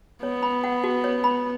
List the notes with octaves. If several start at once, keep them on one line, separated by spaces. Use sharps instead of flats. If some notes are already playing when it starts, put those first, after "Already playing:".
B3 C#5
B5
F#5
F#4
C#5
B5